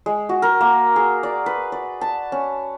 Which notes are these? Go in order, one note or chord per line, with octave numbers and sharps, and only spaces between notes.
G#3
F#4
A#4
A#3
G#4
D5
B4
D5
A5
C#4